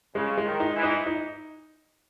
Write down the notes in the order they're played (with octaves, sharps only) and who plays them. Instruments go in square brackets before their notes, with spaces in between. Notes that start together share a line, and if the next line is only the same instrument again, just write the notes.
[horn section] C#3 [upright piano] G#3
[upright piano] G#3
[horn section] D#3
[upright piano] D#4
[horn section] E3
[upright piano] D#4
D#4